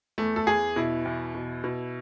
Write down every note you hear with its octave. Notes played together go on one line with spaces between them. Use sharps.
E2 A3
A4
E2 G#4
B2 E4
E2
B2
B2